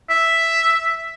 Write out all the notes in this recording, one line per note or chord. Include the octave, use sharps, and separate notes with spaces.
E5